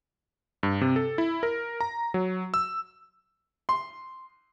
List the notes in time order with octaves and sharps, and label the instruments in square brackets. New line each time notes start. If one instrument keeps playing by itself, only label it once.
[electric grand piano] G2
C3
A4
E4
A#4
A#5
F#3
E6
[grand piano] C6